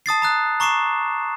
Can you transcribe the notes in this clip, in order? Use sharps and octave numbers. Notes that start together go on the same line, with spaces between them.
A5 D#6 A6 C7
A#5 D#6 F#6
A#5 C#6 D6 C7 E7